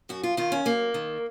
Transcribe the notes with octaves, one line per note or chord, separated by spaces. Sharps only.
F#2 F#4
F4
D#3 F4
C#4
F#2 A#3
D#3